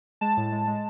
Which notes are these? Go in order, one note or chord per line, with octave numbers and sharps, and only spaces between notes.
G#3 A5
A2
G#3
G#3